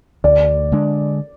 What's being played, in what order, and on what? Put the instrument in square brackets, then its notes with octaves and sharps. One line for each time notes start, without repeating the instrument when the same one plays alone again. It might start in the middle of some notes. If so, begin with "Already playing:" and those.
[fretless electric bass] D2 [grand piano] D5
[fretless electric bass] D3 G#3 D4